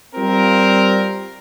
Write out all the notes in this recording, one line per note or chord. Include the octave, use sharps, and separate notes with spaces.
G3 C4 F4 A#4